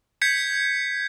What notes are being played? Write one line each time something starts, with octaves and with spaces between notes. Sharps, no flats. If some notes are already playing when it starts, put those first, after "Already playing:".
G6 G#6 B6 C#7